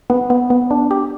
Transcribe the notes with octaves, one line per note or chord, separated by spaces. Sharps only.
B3
B3
B3
D4
G4